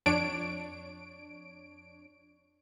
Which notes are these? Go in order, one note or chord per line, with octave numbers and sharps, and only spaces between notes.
F2 D4 C#5 D7